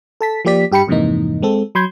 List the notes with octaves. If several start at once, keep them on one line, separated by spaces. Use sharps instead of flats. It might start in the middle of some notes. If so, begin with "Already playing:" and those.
A4 A5 B6
F3 A#3 G4 D5 B6
G2 G4 G5 B5 C#7
F2 G#2 C3 E3 A#3 D#4
G#3 C4 A4
F#3 B5 C6 G6 G#6